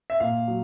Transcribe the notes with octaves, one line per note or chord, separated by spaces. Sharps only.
E5
A#2 F5
F#3